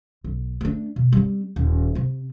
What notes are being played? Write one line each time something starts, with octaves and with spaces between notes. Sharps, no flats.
B1
A3 D4
B2
G3 C4
D#1
C3 C4